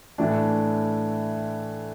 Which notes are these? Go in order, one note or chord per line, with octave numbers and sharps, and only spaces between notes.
A2 E3 A3 D4